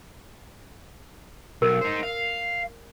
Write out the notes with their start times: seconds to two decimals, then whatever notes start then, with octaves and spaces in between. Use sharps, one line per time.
1.62 B1 A#4
1.81 D#4 C5
2.03 F5